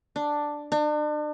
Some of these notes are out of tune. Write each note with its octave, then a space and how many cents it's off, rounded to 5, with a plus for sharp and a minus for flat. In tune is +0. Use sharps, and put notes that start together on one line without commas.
D4 +5
D4 +40